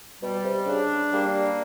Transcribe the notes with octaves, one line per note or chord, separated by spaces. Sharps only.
B2 G3
C3
C#3 D4
G3 A#3